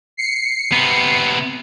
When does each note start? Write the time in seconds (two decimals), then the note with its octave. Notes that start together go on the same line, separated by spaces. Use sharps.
0.17 C7 C#7
0.72 C3 B3